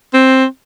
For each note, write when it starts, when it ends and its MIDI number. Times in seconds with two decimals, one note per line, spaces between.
0.14 0.45 60